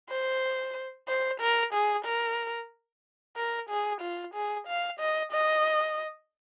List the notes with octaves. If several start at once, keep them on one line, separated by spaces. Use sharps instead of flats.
C5
C5
A#4
G#4
A#4
A#4
G#4
F4
G#4
F5
D#5
D#5